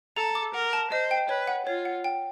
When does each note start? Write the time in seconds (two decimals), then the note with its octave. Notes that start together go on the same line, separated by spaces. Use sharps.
0.17 A4 A#5
0.35 D6
0.54 A#4 F#5
0.73 A5
0.91 C5 D#5
1.11 G5
1.29 B4 C#5
1.47 F#5
1.67 F4 C#5
1.85 F#5
2.04 G5